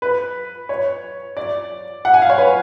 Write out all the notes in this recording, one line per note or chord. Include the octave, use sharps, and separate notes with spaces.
B4
C#5
D5
F#5
G#5
F5
C#5
B4